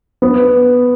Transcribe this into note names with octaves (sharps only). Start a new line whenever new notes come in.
B3